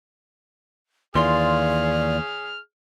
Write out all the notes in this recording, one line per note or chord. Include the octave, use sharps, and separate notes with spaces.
D#2 E3 F4 G#4 D5 C6 F6